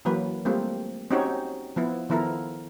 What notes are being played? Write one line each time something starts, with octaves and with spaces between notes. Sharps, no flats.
E3 F#3 A#3 B4
G3 A3 A#3 C4 F4
C4 C#4 D#4 F#4 G4 C#5
F3 B3 E4
D#3 F3 B3 E4 A4 A#4